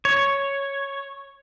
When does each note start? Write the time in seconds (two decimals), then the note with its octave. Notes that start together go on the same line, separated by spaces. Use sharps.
0.05 C#5